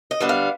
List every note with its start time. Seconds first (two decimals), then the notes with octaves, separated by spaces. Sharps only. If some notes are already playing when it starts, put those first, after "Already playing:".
0.11 D#5
0.20 D3 G3 B3 D4
0.29 F5